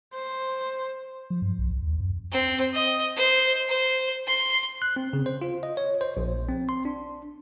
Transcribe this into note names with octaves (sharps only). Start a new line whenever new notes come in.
C5
F3
G2
B1
C2
D#2
F#2
C4
D#5
C5
C5
C6
F#6
C4
C#3
C5
F4
D#5
C#5
C5
A#1
C4
C6
D4